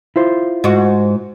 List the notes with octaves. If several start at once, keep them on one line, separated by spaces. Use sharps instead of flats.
E4 F4 C5
G#2 F#4